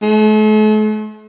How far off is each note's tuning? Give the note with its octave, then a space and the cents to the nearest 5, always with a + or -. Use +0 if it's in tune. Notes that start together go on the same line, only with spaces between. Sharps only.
A3 -45